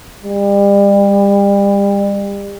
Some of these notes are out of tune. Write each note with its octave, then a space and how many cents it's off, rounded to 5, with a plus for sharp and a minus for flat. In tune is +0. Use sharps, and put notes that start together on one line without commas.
G3 +35